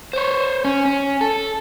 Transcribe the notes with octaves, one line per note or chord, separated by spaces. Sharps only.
C5 C#5
C#4
C#4
A4